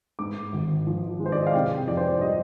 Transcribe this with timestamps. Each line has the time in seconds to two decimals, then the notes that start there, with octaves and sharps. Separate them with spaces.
0.19 G#2 D6
0.53 G#1
0.87 F3
1.20 G#3
1.26 C5
1.32 D5
1.40 D#5
1.47 F5
1.54 C3 G5
1.87 F2 D5
1.97 C5
2.08 D5
2.21 G3 D#5